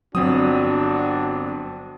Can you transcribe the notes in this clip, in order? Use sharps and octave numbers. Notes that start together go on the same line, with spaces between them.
G1 F#3 C4 D4 F#4 D#6